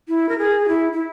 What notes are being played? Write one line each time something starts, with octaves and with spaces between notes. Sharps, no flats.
E4
A#4
G#4
G4
E4
E4